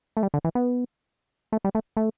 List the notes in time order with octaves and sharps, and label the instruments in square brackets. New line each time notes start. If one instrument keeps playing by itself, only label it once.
[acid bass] A3
G3
D3
E3
B3
A3
G3
A3
A3